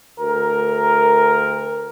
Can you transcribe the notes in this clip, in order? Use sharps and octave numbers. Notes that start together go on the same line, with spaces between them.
D2 A#4